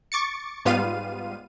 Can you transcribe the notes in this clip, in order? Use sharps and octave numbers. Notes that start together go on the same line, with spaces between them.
C#6 D6 A6 C#7
G#2 G3 B3 F4 F5 D#7